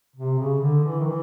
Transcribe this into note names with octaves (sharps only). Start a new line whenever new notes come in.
C3
C#3
D3
E3
D#3
E3